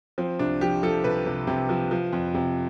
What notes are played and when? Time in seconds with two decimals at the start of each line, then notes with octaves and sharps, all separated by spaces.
0.18 F3 C4
0.39 C2 D4
0.61 F3 G4
0.83 F3 A4
1.04 C2 B4
1.26 C3
1.47 C3
1.69 F3
1.91 F3
2.13 F2
2.34 C3